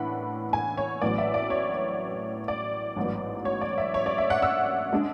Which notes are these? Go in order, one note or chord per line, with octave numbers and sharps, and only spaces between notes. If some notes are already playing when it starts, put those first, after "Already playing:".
Already playing: A2 E3 B3 D4 F#5 B5
G#5
C#5
A1 A2 F#3 B3 D5
E5
D5
C#5
D5
A1 G#2 F#3 B3
C#5
D5
E5
C#5
D5
E5
F#5
E6
G#3 D4